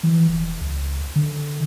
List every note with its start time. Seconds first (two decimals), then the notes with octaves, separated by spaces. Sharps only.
0.03 E3
0.29 E1
0.61 C#2
1.16 D3